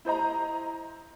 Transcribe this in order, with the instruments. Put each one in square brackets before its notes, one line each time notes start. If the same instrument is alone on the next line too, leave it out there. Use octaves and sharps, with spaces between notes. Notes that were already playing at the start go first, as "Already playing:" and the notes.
[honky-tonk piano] E4 C5 D#5 A#5